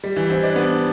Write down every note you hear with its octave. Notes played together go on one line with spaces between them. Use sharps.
G3
E3
C4
D4
B3